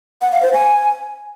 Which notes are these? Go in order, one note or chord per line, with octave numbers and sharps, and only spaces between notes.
F#5
F5
C5
G#5